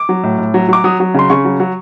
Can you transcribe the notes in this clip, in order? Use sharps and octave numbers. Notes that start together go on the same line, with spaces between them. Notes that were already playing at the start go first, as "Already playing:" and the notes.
Already playing: D6
F#3
A2
A2
F#3
F#3 D6
F#3 D#6
F#3
C#3 C6
C#3 C#6
F#3
F#3